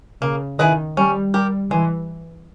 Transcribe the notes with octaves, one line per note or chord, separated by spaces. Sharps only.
C#3 A#3
D#3 E4 G#4 B4 D#5
G3 C#4
G3 G4 A#4
E3 G#3